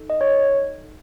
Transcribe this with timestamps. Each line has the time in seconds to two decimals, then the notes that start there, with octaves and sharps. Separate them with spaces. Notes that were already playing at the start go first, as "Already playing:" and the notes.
Already playing: D#4 A4
0.10 D#5
0.21 C#5